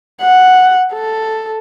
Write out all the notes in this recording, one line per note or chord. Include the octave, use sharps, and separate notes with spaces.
F#5
A4